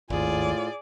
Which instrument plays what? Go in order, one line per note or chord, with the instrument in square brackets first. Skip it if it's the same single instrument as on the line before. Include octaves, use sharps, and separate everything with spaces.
[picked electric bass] G#1 D#2 [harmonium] A2 F4 [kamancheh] G#4 D5